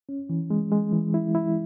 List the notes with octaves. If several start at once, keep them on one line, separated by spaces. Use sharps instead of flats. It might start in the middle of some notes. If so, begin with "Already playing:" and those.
C#4
E3
G#3
G#3
E3
E4
E4